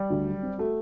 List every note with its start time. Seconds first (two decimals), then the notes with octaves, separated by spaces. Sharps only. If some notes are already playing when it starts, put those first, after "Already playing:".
Already playing: G3
0.10 D2
0.27 F#3
0.43 C4
0.58 A3 F#4